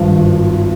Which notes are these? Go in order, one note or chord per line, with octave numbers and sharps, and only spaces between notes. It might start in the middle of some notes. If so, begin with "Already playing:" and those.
Already playing: G#1 G2 F3